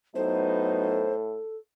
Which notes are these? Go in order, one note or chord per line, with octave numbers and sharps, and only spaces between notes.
A2 F#3 B3 D#4 A4 C5